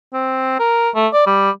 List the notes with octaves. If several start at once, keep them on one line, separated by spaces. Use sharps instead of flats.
C4
A#4
A3
D5
G3